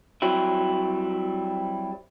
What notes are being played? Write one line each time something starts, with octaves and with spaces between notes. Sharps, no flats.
F#3 G3 C4 E4